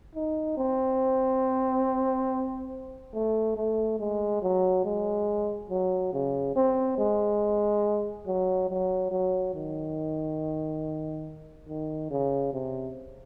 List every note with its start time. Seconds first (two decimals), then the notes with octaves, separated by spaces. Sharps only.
0.15 D#4
0.58 C4
3.14 A3
3.56 A3
4.00 G#3
4.42 F#3
4.85 G#3
5.70 F#3
6.13 C#3
6.56 C4
6.98 G#3
8.26 F#3
8.69 F#3
9.11 F#3
9.54 D#3
11.68 D#3
12.11 C#3
12.53 C3